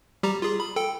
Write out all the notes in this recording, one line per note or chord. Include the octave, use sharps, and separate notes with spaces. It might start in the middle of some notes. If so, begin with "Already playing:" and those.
G3 G4 A#5
F4 G#4
B5
A4 G5